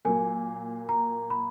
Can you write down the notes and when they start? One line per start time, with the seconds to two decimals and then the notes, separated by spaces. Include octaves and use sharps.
0.05 A#2 F#3 A#3 G#5
0.89 A#5
1.30 B5